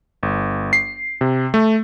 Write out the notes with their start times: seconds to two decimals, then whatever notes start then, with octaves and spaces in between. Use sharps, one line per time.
0.23 G1
0.73 C7
1.21 C3
1.54 A3